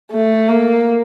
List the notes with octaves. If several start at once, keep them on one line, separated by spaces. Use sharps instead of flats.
A3
A#3